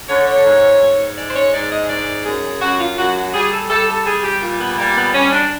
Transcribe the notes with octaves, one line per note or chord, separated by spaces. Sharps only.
D3 C#5
C#5
G#2
G#2
G#3 D5
C5
C#5
G#2 D5
D#5
D#3 D5
F#2 G#4
F#2 F#4
F4
F#2 F#4
F#4
G3 G#4
A4
G3 A4
A4
G3 G#4
G4
A#2 F4
B3
G3 A#3
B3
G3 C#4
D4